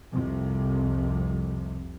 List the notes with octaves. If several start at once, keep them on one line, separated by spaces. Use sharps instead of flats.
C2 F2 C3